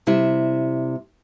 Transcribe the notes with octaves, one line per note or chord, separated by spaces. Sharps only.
C3 G3 E4